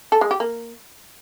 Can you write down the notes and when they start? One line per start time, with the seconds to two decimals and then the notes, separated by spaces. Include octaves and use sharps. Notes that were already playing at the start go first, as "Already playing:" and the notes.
0.12 A4
0.21 G#3
0.31 G4
0.40 A#3